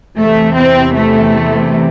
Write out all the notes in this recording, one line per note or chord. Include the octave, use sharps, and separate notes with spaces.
E2 C3 E3 A3
C4
A3